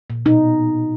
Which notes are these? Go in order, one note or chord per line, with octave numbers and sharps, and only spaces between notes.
A#2
B2 D#4